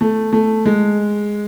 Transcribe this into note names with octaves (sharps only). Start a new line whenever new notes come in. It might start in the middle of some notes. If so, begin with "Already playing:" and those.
A3
A3
G#3